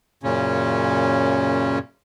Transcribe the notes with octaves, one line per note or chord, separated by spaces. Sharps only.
F#2 A#2 C#3 C#4